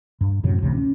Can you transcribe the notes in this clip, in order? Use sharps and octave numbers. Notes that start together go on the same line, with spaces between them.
G2
F#2 A2 C3 F#3
A1 D2 C3
C#4 D4